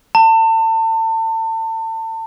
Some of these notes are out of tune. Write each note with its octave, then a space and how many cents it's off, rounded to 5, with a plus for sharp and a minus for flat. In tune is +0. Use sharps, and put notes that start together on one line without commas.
A5 +35